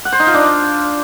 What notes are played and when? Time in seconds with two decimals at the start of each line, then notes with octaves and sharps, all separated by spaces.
0.05 F#5
0.12 C5
0.20 D#4
0.27 F4
0.34 D4